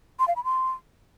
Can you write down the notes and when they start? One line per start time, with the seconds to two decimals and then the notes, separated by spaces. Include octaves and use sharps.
0.19 C6
0.28 F5
0.36 B5
0.44 C6